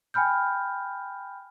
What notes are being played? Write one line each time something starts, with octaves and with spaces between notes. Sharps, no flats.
G5 G#5 B5 F6 G6